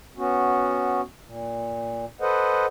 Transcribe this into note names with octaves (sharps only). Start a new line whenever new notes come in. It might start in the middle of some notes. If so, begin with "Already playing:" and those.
B3 C#4 F#4
A#2
A4 B4 C5 D#5 F#5